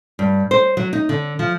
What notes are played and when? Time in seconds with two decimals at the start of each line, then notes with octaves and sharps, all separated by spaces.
0.19 G2
0.51 C5
0.77 F#3
0.93 D#4
1.09 D3
1.39 F3